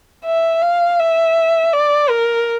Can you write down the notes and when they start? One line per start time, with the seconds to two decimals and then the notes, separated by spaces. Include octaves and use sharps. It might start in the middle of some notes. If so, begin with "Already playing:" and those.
0.25 E5
0.62 F5
0.99 E5
1.73 D5
2.09 A#4